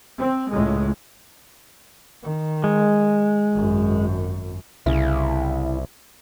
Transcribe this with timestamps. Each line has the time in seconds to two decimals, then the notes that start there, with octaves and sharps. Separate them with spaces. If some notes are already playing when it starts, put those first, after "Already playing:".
0.18 C4
0.51 C#2 A2 G#3
2.23 D#3
2.64 G#3
3.54 G#1 F#2
4.86 C2 C#3 E4